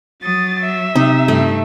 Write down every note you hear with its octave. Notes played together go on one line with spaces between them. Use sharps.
F#3 D#6 A6
E5
C3 D#4
G2 A3